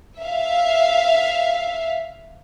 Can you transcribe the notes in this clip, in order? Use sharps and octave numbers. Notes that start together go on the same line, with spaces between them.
E5 F5